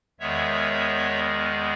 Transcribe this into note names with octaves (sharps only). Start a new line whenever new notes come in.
E2 D#3 G#3 B3 C#5 E5